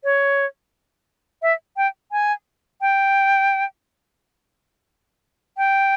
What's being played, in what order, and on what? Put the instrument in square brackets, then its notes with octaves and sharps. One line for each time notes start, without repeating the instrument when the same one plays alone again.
[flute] C#5
E5
G5
G#5
G5
G5